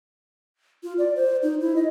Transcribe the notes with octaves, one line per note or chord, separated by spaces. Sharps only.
F4
D5
C5
D#4
E4
D#5